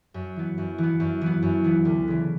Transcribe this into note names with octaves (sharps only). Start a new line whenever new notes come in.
F#2
E3 B3
F#2
E3 B3
F#2
E3 B3
F#2
E3 B3
D2
C#3 E3